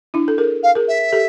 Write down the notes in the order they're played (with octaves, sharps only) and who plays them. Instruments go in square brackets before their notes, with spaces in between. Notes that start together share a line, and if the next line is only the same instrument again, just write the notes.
[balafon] D4 E4
A4
G#4 A#4
[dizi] F5
[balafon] G#4 A#4
[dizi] E5
[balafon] G4 A4